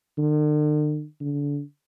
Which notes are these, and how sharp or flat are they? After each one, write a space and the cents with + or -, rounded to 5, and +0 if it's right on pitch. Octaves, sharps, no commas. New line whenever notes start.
D3 +45
D3 -30